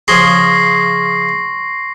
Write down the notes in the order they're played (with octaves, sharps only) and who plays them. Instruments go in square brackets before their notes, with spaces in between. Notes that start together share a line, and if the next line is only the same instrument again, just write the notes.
[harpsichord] C#3 F3 G#4 [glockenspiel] C6 C#6 F#7 [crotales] A#6 C7